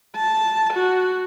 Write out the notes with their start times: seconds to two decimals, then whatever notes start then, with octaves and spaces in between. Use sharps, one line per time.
0.16 A5
0.73 F#4